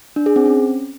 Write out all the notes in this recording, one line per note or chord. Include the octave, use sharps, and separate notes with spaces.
D4
G#4
C4
C#4